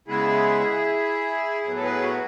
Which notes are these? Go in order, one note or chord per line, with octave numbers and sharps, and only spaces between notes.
C#3 G#3 B3 E4 G#4
A2 F#3 B3
A4
G#4 B4
F#4